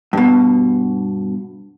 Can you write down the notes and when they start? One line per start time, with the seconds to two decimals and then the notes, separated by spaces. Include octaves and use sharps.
0.13 G2 B2